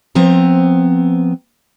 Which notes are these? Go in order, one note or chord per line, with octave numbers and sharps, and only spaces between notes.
F3 B3 C4 A#5